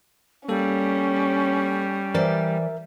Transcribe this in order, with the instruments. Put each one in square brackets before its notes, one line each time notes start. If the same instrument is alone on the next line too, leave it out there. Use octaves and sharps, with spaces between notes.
[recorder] G3 [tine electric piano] A#3 A4 [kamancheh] C#4
[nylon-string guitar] E3 C5 D5 [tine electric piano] A#4 E5